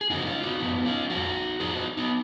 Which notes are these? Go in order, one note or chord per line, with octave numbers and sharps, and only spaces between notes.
G#4
F#2 C#3 F3 D#4 F#4
C#4 F4
D#4 F#4
F#2 C#3 F3 B3 D#4
C#4 F4
F2 F3 D#4 F#4
F2 F3 F4 G#4
D#4 F#4
B3 D#4